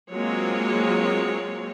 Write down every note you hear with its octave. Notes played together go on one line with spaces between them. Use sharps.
F#3 G#3 A#3 C4 F4 C#5